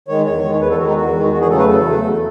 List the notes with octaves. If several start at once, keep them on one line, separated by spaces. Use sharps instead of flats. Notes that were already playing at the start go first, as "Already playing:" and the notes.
D#3 G#3 C#5
E2 C#5
D#3 G#3
E2 B4
A4
D#3 G#3 F#4
D#4
E2 F#4
D#3 G#3
E2 F#4
G#4
C#3 F#3 A3 A4
B4
E2 A4
C#3 F#3 A3
E2